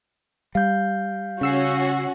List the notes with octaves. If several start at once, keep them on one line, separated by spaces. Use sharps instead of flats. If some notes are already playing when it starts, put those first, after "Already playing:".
G3 F5 G6
C#3 C#4 F#4 E6 C7